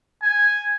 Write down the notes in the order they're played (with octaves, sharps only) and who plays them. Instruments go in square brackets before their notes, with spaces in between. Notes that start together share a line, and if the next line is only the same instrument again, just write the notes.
[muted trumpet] G#5